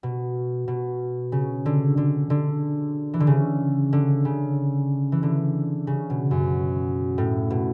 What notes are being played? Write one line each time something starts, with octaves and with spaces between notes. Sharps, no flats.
B2
B2
C#3
D3
D3
D3
E3
D3
C#3
D3
C#3
E3
D3
C#3
B2
F#2
A2
B2